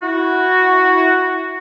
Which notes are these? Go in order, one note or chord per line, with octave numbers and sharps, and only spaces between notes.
E4 F#4